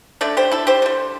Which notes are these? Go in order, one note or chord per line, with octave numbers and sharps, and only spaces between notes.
D3 A3 A4 D5
G4 C5
E4 A4
G4 C5
D3 G3